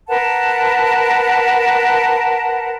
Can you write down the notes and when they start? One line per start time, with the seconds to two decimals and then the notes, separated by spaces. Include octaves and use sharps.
0.08 A#4 B4 F#5 A5